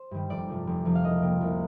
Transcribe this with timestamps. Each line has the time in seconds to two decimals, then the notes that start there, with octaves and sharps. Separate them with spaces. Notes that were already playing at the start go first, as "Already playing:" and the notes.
Already playing: C5
0.11 G2 D#3 G3
0.30 F1 D5
0.49 F2 C3 F3
0.67 F1
0.85 F2 C3 F3
0.95 F5
1.03 C2 D#5
1.22 C3 G3 A#3
1.41 C2